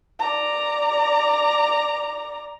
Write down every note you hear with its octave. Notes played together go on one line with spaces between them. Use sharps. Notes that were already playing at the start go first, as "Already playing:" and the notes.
D5 A#5